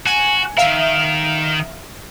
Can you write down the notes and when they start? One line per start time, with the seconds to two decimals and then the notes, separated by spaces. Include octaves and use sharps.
0.06 F#4 G#5
0.58 D#3 A#4 E5 F5